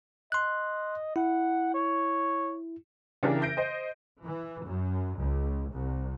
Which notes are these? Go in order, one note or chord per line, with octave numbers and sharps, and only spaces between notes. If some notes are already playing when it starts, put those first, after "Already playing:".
D#5 C6 F#6
E4 F#5
C#5
C#3 E3 D4 E4 G4 A#4
E5 G6 A#6 D7
C5 D#5
E3
F#2
C#2
C2